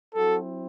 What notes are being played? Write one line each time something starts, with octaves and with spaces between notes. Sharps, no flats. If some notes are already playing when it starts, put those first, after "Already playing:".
F#3 C4 E4 F#4 A4